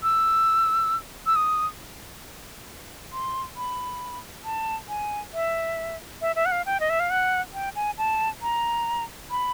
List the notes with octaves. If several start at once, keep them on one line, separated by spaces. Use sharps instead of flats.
E6
E6
D#6
C6
B5
A5
G#5
E5
E5
E5
F#5
F5
G5
D#5
E5
F5
F#5
G5
G#5
A5
A#5
B5